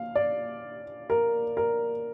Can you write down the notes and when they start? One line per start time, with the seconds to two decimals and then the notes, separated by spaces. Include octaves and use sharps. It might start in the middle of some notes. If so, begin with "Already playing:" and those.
Already playing: F5
0.15 D5
1.10 A#4
1.57 A#4